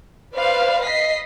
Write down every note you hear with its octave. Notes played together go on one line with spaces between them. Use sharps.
B4 C5 D5 F5
D#5 B6 C7